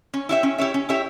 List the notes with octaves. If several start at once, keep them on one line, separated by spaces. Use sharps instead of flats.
C#4
E4 G4 C#5 E5
C#4
E4 G4 C#5 E5
C#4
E4 G4 C#5 E5